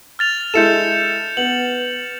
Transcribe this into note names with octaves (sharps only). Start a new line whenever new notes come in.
F6 A6 F7
G#3 E4 A4 G6 C#7 E7
B3 F#7